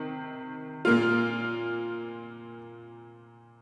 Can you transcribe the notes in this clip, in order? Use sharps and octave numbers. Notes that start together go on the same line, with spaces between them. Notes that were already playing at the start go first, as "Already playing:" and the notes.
Already playing: C3 D#3
A#2 A#3 F4